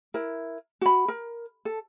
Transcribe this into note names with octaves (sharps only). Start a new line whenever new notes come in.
E4 A#4
F#4 B5
A#4
A4